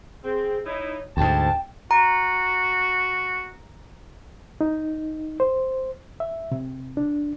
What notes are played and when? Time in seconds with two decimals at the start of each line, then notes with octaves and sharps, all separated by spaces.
0.24 C4 G#4
0.66 D#4 E4 C#5
1.17 D2 G#2 G5 A5
1.91 F#4 A#5
4.61 D#4
5.40 C5
6.20 E5
6.52 C3
6.97 D4